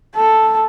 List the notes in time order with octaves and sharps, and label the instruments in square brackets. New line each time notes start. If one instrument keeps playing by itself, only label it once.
[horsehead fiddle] A4